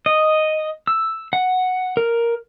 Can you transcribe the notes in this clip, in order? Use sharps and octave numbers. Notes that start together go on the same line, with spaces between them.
D#5
E6
F#5
A#4